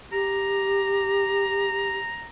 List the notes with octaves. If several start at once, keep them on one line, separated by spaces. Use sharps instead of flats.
G4 A#5